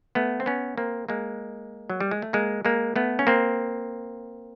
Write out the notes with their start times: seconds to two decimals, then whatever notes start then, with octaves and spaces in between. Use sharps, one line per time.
0.15 A3 B3
0.40 C4
0.46 B3 C#4
0.77 A#3 C4
1.09 G#3 A#3
1.90 F#3
2.00 G3
2.11 G#3
2.22 A3
2.33 G#3 A#3
2.65 G#3 A#3
2.96 A3 B3
3.19 C#4
3.27 A#3 C4